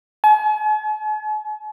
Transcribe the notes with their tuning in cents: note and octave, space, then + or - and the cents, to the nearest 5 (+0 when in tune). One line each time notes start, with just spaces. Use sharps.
G#5 +45